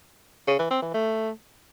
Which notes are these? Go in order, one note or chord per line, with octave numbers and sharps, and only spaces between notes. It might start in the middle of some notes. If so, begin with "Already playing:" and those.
C#3
E3
C4
E3
A3